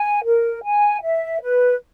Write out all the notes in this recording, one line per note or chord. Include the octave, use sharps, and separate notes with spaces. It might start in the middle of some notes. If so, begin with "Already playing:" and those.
Already playing: G#5
A#4
G#5
E5
B4